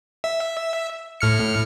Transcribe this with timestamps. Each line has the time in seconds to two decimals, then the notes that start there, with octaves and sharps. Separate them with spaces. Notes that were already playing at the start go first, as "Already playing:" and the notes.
0.24 E5
1.21 A2 F6 C#7